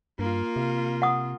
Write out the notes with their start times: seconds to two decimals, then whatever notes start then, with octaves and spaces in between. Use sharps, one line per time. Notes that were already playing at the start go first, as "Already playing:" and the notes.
0.19 G2 A#3 F4
0.56 C3
1.02 F#5 D#6